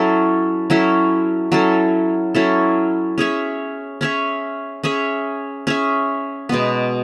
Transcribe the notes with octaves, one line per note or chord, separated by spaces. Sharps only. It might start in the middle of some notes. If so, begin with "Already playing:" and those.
Already playing: F#3 C#4 E4 A4
F#3 C#4 E4 A4
F#3 C#4 E4 A4
F#3 C#4 E4 A4
C#4 G#4 C#5 E5
C#4 G#4 C#5 E5
C#4 G#4 C#5 E5
C#4 G#4 C#5 E5
B2 G#3 B3